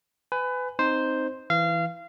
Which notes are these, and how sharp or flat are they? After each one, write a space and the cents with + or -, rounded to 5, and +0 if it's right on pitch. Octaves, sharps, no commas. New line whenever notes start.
B4 +25 G#5 +0
C4 +0 D#4 +0 C5 +0
E3 +0 F5 -25